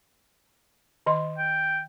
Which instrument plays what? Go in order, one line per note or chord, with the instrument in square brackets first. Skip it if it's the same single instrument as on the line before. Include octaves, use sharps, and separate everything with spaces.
[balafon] D#3 D#5 C6
[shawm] G5